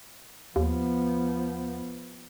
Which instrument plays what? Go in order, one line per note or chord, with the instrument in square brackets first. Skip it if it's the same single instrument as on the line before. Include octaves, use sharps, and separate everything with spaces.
[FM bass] D#2 [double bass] F3 B3